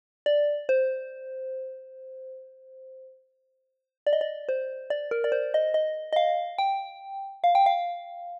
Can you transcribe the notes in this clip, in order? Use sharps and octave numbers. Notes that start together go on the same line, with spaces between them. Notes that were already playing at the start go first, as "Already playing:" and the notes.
D5
C5
D5
D#5
D5
C5
D5
A#4
D5
C5
D#5
D#5
D#5
F5
G5
F5
G5
F5